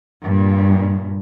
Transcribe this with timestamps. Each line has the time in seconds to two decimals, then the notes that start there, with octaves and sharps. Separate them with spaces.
0.23 G2 A#2